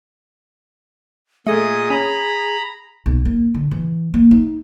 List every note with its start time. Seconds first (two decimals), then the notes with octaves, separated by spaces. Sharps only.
1.47 A#2 A3 G#4 D#5 D#6
1.90 C#4 A#5 B5
3.06 B1
3.25 A#3
3.54 D3
3.71 E3
4.14 A#3
4.31 D#4